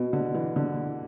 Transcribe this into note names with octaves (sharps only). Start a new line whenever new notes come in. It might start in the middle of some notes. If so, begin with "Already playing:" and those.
Already playing: B2
D3
E3
D3